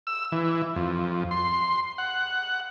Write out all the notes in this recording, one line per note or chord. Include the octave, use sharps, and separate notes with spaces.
E6
E3
F2
C6
F#5